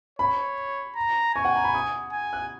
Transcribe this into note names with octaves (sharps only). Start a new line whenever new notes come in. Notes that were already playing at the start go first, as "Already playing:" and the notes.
C#5 B5
A#5
G#5 C#6
F#5
A#5
B5
D#6
G#5
F#6